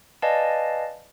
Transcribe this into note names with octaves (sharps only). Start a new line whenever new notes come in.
B4 D5 D#5 F5 G#5 A5